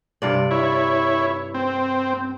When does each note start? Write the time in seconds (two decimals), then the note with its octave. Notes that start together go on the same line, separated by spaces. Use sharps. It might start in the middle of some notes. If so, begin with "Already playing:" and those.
0.22 G2 C3 D5
0.51 E4 C#5
1.54 C4